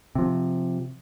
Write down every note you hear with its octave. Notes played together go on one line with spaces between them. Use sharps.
C3 F3